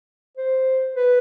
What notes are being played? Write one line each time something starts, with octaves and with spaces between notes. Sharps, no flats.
C5
B4